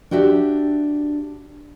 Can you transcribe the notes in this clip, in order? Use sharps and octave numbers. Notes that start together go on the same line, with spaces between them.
D4 F#4 G4 E5